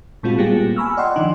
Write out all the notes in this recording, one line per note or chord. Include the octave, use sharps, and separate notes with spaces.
A#2 G#3 C4 F4 F#4
G3 A#3 B3 F4 G4 G#4
G#5 A#5 B5 C#6 E6 F6
D5 D#5 F#5 G5 C6
D#3 F3 D4 D#4